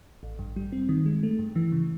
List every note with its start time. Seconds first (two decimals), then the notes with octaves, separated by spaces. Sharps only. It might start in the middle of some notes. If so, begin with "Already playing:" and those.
0.23 A1
0.39 G2
0.56 G3
0.72 C4
0.89 D#3
1.06 G#3
1.23 A3
1.39 G2
1.56 E3
1.72 C#3